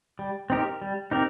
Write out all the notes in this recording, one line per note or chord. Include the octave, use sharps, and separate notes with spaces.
G3
C4 D#4 G4 A#4
G3
C4 D#4 G4 A#4